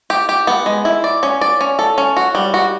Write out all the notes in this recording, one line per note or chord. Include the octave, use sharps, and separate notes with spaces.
G4
G4
B3
G#3
E4
D5
C#4
D5
C#4
A4
C#4
F#4
G3
F#4